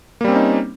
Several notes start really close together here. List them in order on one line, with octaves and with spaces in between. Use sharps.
A#3 G3 C4 C#4 D#4